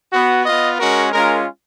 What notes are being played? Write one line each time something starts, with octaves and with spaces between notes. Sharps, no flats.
B3 F#4
B3 F4 D#5
G#3 C#4 F#4 A#4
G#3 C#4 F4 A#4